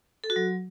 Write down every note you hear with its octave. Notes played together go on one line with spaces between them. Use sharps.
A4
F#4
F#3